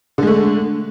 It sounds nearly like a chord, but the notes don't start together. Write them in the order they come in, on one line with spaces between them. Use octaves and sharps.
D3 G#3 A3